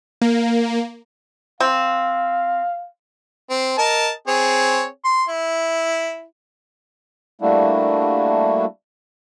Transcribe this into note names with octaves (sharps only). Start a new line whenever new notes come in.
A#3
C4 F5
C4
A#4 D#5 A5
C4 G#4 C#5
C6
E4
G3 A3 A#3 D4 E4 F#4